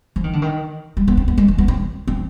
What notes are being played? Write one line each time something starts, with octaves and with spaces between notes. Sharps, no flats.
F3
D#3
D3
D#3
G3
B3
C4
B3
G#3
G3
B3
C4
C4